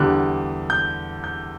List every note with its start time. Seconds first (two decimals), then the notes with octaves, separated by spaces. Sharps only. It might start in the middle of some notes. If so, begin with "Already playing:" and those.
Already playing: E2 D3 G3 F#6
0.70 G6
1.24 G6